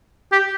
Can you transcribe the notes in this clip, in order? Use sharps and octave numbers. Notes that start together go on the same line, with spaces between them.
G4